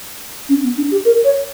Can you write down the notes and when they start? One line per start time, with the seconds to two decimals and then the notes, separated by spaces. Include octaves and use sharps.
0.49 C#4
0.64 B3
0.77 D4
0.91 G4
1.05 A#4
1.24 C#5